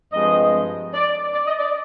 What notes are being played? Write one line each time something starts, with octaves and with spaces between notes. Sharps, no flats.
G2 F3 G#3 C4 D#5
D5
D5
D#5
D5